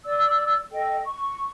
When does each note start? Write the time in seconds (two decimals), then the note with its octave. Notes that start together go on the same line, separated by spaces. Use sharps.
0.04 D5 E6
0.70 A4 D#5 G5
1.04 C#6